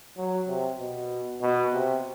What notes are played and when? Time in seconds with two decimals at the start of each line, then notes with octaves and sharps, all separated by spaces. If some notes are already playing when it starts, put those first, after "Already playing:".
0.17 F#3
0.48 C3
0.79 B2
1.41 B2
1.73 C3